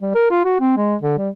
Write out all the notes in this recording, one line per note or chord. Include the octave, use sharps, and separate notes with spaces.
G3
A#4
F4
F#4
C4
G#3
D3
G3